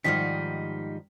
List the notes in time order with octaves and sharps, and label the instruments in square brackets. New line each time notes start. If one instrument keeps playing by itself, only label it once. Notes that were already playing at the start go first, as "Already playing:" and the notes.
[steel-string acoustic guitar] G#2 G3 D#4 [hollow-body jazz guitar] D#3 F3 [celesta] F6 B6